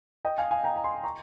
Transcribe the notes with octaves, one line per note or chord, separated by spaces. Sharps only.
D#5 G5
F5 G#5
F5 G#5
G5 A#5
A#5
G#5 C6
A#5 C#6